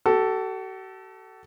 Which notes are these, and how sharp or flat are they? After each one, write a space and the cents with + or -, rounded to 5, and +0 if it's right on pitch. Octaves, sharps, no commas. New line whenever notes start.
F#4 +45 A4 +0